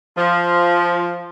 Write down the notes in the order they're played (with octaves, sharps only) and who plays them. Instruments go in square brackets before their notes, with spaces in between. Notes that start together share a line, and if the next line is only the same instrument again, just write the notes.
[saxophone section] F3